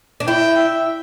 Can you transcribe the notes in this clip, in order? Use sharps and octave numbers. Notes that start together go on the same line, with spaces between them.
D4
E4 G5
E5